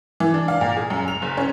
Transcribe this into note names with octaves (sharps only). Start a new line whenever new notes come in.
E3
D4
F5
A#2
G#4
F#2
F7
F#1
C#4